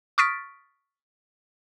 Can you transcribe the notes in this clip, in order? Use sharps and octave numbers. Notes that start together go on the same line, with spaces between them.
C#6 D#6 F6 A6 B6 D7